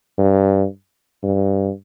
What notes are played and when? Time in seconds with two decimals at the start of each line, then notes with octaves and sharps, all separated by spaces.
0.18 G2
1.23 G2